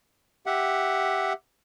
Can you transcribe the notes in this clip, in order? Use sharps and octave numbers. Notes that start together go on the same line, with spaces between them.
G4 E5 F#5